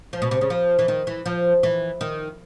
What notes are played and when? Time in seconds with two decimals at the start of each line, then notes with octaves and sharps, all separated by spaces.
0.13 F3
0.22 B2
0.31 C3
0.41 C#3
0.50 F3
0.79 E3
0.88 D#3
1.07 E3
1.26 F3
1.63 E3
2.01 D#3